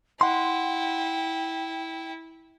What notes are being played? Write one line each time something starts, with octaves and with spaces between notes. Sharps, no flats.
E4 F#5 G5 C6